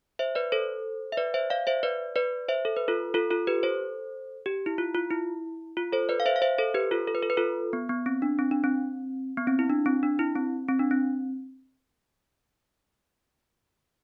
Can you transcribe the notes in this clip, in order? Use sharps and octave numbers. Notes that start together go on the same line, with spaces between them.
C5 E5
B4 D5
A4 C5
E5
B4 D5
C5 E5
D5 F5
C5 E5
B4 D5
B4 D5
C5 E5
A4
B4
F4 A4
F4 A4
F4 A4
G4 B4
A4 C5
G4
E4
F4
F4
E4
F4
A4 C5
B4 D5
F5
C5 E5
F5
C5 E5
A4 C5
G4 B4
F4 A4
A4
B4
A4
B4
F4 A4
B3
B3
C4
D4
C4
D4
C4
B3
C4
E4
D4
C4
D4
E4
C4
C4
D4
C4